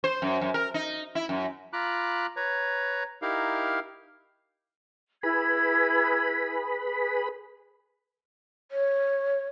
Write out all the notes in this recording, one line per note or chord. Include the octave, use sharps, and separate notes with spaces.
C5
F#2
F#2
A#4
D#4
E4
F#2
F4 A#5 B5 D6 F#6
B4 C#5 A#5
D#4 E4 G4 A#4 F5
E4 G#4 B4 B5 G#6
C#5